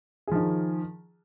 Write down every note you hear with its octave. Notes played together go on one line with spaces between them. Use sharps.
D#3 F3 G#4